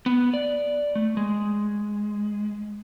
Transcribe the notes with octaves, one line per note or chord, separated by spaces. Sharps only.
B3
D5
A3
G#3